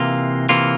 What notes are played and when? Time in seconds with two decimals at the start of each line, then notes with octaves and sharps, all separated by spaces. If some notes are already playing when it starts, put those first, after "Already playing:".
Already playing: C3 E3 A#3 F4
0.49 C3 E3 A#3 F4